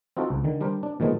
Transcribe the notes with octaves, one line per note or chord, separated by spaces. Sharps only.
C4 D#4 F4 F#4 A4
C#2
D3 D#3
G3 D4 A#4 C5
D4
A#2 D#3 F3 G#3 A3 B3